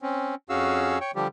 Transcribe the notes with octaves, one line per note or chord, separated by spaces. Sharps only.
C4 C#4
F2 C#4 F#4 G#4 F5 E6
C#5 G5 C#6
D3 F3 G3 G4